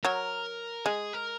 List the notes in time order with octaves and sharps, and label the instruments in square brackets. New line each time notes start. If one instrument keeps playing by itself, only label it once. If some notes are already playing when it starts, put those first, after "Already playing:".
[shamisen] F#3 [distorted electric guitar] A#4
[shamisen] G#3 [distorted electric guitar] G#4
[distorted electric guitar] A#4